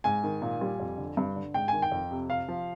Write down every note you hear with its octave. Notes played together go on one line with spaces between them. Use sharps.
G#2 G#5
D#3
A#2
G3
F2
D3
G2
D3
G#2 G5
D#3 G#5
G5
F2
C3
C3 F5
F3